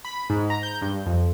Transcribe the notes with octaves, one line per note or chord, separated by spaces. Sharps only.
B5
G#2
A#5
G6
G2
F2